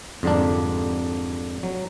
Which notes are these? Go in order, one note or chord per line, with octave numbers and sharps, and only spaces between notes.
F2 G#2 D3 G3 A#3 D4
F#3